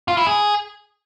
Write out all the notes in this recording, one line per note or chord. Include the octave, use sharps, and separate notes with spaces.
F4
E4
G#4